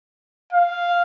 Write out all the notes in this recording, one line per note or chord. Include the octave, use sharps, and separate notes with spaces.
F5